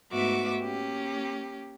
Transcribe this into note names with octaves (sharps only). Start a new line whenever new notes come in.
G#2 A3 B3 F#4 E5 D6
A#3 C#4 G4